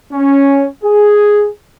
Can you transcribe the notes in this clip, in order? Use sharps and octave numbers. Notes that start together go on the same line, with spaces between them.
C#4
G#4